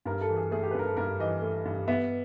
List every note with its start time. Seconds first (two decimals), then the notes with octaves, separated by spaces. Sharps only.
0.06 G2 A#4
0.21 A4
0.29 E3
0.36 G#4
0.51 A3 G#4
0.63 G4
0.71 B4
0.75 G2 A#4
0.86 A4
0.97 G2 A#4
1.20 E3 D#5
1.42 A3
1.65 G2
1.88 B3 E5